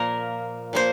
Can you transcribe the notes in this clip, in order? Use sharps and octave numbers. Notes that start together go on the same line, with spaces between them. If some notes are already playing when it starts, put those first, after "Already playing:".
Already playing: A#2 F3 A#3 A#4
A#2 F3 A#3 C5